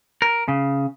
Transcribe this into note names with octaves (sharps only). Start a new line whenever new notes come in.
A#4
C#3